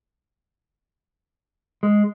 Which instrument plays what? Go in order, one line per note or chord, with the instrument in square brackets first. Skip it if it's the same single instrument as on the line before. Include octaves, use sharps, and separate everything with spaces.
[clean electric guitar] G#3